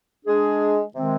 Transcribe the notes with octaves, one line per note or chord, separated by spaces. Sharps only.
G#3 D4 G#4
C3 D#3 G#3 C4